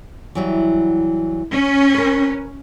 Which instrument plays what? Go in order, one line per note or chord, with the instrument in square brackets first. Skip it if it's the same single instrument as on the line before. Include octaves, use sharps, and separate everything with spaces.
[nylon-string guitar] E3 F#3 G3
[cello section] C#4
[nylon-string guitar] A#4 B4